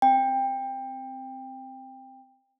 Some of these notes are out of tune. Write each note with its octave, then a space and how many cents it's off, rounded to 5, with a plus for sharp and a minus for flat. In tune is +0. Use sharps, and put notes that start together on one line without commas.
C4 -10 G5 +20